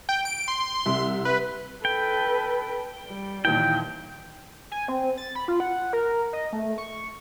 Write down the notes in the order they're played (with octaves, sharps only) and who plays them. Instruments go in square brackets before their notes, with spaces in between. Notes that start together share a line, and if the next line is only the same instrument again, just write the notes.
[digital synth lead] G5
D7
C6
[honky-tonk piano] C2 E5
[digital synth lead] B4
[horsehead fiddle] A4 B4 [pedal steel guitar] G5
[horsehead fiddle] G3
[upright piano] D#2 A#2 E3 [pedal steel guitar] G5
[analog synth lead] G#5
C4
A6
B5
F4
F#5
A#4
D#5
A3
C#6